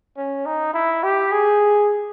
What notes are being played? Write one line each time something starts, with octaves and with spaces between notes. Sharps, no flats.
C#4
D#4
E4
G4
G#4